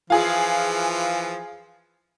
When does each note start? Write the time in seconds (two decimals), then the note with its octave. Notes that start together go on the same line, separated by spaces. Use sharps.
0.10 E3 F3 F4 G#4